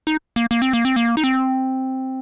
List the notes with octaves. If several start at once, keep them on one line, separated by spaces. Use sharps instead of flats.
D#4
A#3
A#3
C4
A#3
C4
A#3
D#4
C4